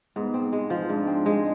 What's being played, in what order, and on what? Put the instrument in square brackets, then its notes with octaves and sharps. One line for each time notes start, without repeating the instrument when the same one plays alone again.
[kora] G#2 [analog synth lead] B3
[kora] C4
G#3
F3
[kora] G#2 [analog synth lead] D4
[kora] C4
G#3